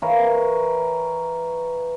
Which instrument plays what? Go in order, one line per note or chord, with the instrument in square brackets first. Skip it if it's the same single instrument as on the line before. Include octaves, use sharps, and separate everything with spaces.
[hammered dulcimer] E3 A#4 C#5 F5